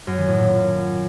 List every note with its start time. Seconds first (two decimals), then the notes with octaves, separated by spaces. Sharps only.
0.07 F#2
0.17 D#3
0.28 A2
0.38 A#2